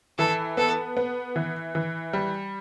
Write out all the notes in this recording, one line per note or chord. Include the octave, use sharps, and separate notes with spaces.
E3 A4
B3 A4
B3
E3
E3
G3